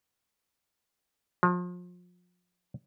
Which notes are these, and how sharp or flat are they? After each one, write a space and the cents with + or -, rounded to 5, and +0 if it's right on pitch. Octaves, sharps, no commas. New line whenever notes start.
F3 +35